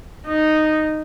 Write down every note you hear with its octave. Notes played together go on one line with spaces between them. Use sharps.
D#4